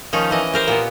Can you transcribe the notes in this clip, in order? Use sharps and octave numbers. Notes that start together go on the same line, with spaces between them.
D#3 F3 C#4 D#4
E3 D#5
G4 A#4 C5
A#2 B3